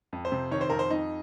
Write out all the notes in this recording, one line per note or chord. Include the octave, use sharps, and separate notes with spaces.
F2
C5
C3
D#3 C#5
C5
F2 A#4
C5
F2 D#4